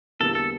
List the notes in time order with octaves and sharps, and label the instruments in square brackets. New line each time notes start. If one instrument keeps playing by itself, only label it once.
[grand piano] E2 D3 G3 A#3 E4 [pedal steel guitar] A4
[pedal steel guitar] A4